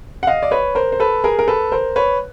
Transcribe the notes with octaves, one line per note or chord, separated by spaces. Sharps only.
F#5
D#5 F5
D5
B4 C#5
A#4 C5
C5
A4 B4
G#4 A#4
A#4
A4 B4
A#4 C5
B4 C#5